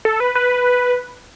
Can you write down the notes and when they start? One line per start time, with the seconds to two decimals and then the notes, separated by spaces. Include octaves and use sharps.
0.05 A4
0.20 B4
0.35 B4